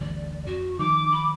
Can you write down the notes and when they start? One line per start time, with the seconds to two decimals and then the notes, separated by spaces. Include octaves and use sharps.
0.01 G1 D2 E3 D5
0.47 F2 F#4
0.79 D#3 F3 D#4 D6
1.12 B5